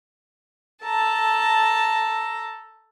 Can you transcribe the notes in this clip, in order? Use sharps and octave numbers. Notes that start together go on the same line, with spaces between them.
A4 A5 A#5